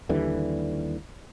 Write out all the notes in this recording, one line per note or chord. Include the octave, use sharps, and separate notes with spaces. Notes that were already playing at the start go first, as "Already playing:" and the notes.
D#2 D3 E3 G3